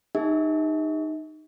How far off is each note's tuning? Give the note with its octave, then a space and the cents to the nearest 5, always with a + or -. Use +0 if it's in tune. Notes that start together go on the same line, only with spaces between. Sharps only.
D#4 -15 G4 +45 E5 -45